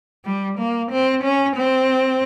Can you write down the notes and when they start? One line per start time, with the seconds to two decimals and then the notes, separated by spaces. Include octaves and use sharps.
0.25 G3
0.59 A#3
0.91 C4
1.23 C#4
1.56 C4